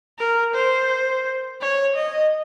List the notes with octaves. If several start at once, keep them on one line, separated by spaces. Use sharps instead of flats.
A#4
C5
C#5
D#5